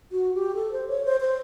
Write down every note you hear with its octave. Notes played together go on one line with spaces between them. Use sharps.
F#4
G4
A4
C5
C#5
C5
C5